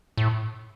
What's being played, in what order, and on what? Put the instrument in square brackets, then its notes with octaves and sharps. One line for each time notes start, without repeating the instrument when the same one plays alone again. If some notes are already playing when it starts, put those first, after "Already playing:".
[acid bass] A2